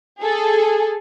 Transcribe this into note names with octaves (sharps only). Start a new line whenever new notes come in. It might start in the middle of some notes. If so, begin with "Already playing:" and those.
G#4 A4